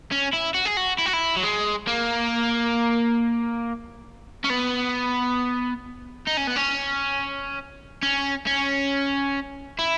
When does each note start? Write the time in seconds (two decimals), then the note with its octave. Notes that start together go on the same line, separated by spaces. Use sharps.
0.11 C#4
0.33 E4
0.54 F#4
0.65 G#4
0.77 F#4
0.98 E4
1.06 F#4
1.13 E4
1.36 F#3
1.43 G#3
1.87 A#3
4.44 C#4
4.50 B3
6.27 D#4
6.37 C#4
6.47 B3
6.56 C#4
8.03 C#4
8.47 C#4
9.79 E4